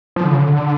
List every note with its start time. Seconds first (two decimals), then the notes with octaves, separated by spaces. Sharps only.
0.16 F3
0.25 D3
0.32 C#3
0.40 D3
0.54 D3